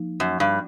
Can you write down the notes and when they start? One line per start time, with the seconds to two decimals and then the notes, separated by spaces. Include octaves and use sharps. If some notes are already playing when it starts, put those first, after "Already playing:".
Already playing: F3 A#3 D#4
0.20 F#2
0.40 G2